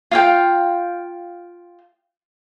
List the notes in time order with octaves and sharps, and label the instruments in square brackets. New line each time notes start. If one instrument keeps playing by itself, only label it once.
[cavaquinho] F4 F5 G5